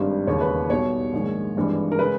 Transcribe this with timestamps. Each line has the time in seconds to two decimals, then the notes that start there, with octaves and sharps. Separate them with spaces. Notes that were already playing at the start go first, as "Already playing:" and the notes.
Already playing: G#1 G2 G3
0.26 E1 D#2 C#3 C#5
0.41 B4
0.69 B1 B2 G3 C#5
1.13 A#1 G#2 D#3 G#3
1.57 G#1 G2 E3 G#3
1.92 A#4
1.99 C#3 G#3 B4